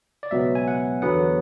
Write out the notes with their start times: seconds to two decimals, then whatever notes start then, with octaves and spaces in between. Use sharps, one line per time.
0.23 D5
0.31 C#2 B2 F#3 B3 E5
0.55 G#5
0.68 F#5
1.02 E2 D3 F#3 B3 F#5